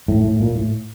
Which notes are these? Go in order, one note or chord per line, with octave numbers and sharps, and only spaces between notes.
A2
A2
A#2
A2